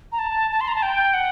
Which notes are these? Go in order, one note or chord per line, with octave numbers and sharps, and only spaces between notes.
A#5
A5
A5
C6
A#5
A5
G5
F#5